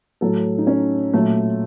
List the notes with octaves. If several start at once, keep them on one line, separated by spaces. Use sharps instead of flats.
A2 F#3 A4
D#4
C#4
A#2 F#3 A3